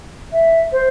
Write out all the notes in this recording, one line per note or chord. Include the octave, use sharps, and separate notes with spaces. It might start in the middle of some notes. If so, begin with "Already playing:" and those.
E5
C5